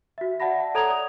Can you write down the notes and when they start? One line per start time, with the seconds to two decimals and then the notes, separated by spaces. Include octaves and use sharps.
0.18 F#4 E5
0.40 D5 E5 F#5 A5 B5 A#6
0.60 F#5
0.75 A4 C#5 A#5 D#6 G#6 F7
0.89 D5 D#6